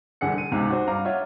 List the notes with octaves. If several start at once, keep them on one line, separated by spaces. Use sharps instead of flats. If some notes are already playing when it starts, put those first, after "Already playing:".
C2 D3 G#4 F#5 C#7
D#7
C#2 G#2 C3
F#4 C5
G2 F5 A#5 D6
F4 C#5 E5 F#5